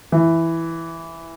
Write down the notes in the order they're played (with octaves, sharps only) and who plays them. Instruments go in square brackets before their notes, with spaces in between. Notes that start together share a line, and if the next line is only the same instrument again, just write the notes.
[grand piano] E3